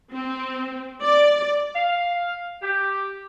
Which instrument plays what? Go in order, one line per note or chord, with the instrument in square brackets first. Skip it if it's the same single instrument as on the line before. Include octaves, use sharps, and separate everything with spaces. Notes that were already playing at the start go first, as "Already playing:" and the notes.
[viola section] C4
D5
[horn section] F5
G4